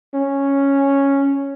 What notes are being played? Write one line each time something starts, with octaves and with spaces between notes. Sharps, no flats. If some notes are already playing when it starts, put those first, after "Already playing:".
C#4